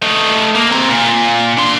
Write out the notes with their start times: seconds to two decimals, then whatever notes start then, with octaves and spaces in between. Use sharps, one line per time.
0.02 A3 D#4
0.55 A#3
0.71 C4 A#5
0.90 A#2
1.57 D4 C6